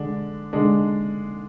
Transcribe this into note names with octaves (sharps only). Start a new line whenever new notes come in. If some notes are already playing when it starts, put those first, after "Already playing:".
Already playing: D3 G#3 D4
D3 G#3 D4